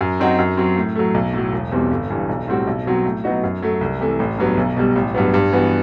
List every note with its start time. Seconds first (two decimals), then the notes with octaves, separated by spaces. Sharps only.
0.01 F#2
0.20 F#3 C4 D#4 F#4
0.38 F#2
0.57 F#3 C4
0.76 A2
0.95 F#3 A3
1.14 B1
1.34 A2 F#3
1.53 E1
1.72 E2 B2 G3 C4
1.91 G1
2.10 G2 E3
2.29 B1
2.48 A2 G3 C4 F#4
2.67 B1
2.86 B2 F#3 C4 F#4
3.05 A2
3.24 F#3 B3 D#4 F#4
3.43 F#2
3.62 F#3 A3
3.81 C2
4.00 C3 E3 A3
4.19 A1
4.38 G2 F#3 B3
4.57 B1
4.76 B2 G3
4.96 A1
5.14 G2 F#3 B3
5.34 G2
5.53 E3 B3 F#4